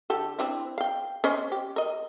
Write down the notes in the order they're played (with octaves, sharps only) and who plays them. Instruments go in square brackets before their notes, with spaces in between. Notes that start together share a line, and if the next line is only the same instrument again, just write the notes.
[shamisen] D3 G4 A4
C4 D4 E4
F5 G5
C#4 C5 D#5
G4
A#4 D#5